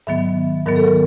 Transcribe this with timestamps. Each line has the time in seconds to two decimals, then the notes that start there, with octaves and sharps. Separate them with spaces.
0.07 G#2 D#3 F#3 B3 E5
0.66 G#2 D#3 F#3 B3 A#4
0.76 A4
0.86 A#4